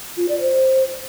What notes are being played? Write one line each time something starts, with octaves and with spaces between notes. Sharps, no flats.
F4
D5
C5